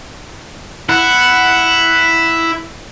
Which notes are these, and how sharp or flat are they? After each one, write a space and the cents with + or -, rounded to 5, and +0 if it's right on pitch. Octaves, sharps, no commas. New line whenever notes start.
E4 +0 F#5 +0